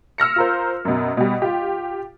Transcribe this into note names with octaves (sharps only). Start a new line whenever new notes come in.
E6 F6 A#6 C#7
F4 A#4 C5
F#2 B2
B2 G3
F4 G4